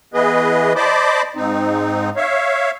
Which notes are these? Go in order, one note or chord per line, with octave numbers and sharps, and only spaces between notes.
E3 B3 G#4 B4 D#5
C5 D5 D#5 A5 B5 D6
G#2 C4 D#4
C#5 E5 F5